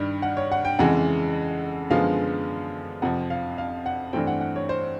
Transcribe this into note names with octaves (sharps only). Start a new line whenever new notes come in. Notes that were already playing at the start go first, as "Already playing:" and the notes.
Already playing: G2 D#3 G3
F#5
C#5
F#5
G5
F2 C#3 E3 G#3 F#5
F#2 D3 F3 G#3 B3 F5
F2 C3 F3 F#5
F5
F5
F#5
G2 E3 A3 C4 G5
F#5
F#5
C#5
C5